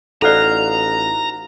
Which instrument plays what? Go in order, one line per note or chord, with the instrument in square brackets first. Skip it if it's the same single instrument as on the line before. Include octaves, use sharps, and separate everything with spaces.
[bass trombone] A1 [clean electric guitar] D#4 F#4 F5 [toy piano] A4 C5 D5 [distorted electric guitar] A#5